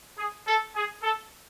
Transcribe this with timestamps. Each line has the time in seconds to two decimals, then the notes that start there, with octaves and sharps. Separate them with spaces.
0.18 G#4
0.47 A4
0.75 G#4
1.03 A4